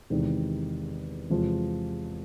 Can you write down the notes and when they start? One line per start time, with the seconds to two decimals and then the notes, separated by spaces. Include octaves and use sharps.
0.10 E2 C3 D#3 G#3
1.30 E2 C3 F3 G#3